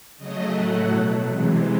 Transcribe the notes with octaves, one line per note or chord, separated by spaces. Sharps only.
C#3 F#3 A3 D#5
A2 F#3 A3 F#5
B2 F#3 A3
C3 E3 G#3